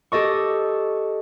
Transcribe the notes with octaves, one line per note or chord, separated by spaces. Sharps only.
G4 A4 D#5 C#6